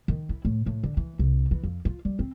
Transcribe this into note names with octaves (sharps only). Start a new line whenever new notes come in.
D#3
E4
A2
A2
D3
E3
C2
E3
F2
F4
G3
C4